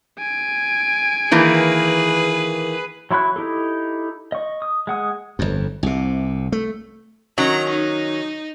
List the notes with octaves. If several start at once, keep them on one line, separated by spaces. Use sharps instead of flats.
G#5 D7
D#3 E3 A#3 G#4 B4
F#3 E4 B5 C#6 F#6
D#4 E4 G4 A4
D#5 C#6
D#6
G#3 F#5 D#6
G1 F2
C2 C3
A3
D#3 F#3 C#4 A#5
D#4